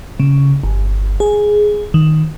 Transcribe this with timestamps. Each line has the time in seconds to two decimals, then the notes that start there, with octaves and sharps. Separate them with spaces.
0.20 C#3
0.64 G1
1.20 G#4
1.94 D#3